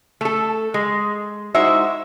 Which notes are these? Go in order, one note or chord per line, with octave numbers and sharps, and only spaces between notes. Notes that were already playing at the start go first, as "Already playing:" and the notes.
A3 A4
G#3
G#3 D#4 E4 F#4 C5 E5